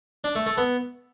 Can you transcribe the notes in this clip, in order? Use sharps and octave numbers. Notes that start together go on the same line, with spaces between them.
D4
A3
A3
B3